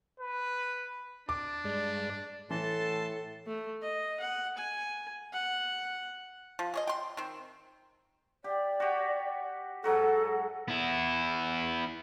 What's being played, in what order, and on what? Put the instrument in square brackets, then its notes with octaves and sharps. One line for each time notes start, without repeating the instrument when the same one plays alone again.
[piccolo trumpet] B4
[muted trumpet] D4 [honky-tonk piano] D6
[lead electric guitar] G2 [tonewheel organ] G#3 D5
[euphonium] A2 [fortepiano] E3 [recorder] A4 [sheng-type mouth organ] A5 C6
[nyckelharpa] A3
D#5
F#5
G#5
F#5
[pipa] F3
G#4 C#5 D#5
G5 C6
D#3 C4
[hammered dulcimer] G4 [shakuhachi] D5
[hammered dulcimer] F#4 G4
[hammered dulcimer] G#2 F#3 F#4 [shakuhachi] A4
[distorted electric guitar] B3 E4